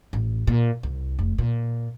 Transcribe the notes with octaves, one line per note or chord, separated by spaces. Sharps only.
A1
A#2
C2
F1
A#2